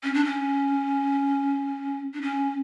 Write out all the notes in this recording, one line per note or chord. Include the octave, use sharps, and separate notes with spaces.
C#4
D4
C#4
D4
C#4